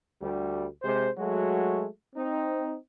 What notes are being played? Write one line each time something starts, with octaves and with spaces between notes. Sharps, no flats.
D2 G3
C3 G#3 C5
F#3 G#3 A3 F#4
C4 D#4